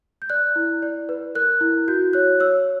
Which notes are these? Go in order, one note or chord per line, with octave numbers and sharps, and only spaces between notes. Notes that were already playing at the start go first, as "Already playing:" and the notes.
G6
D5 F#6
E4
D5
B4
A#4 F#6
E4
F#4 G6
C#5 F#6
C#5 E6